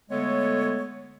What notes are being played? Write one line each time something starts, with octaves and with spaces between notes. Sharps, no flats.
D3 G#3 A3 B3 A4 C#5